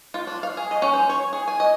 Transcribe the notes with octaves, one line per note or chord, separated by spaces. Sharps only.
F4
D4
F5
G#4
D#5
C#4
C5
C#5
G#4
G#5
D#5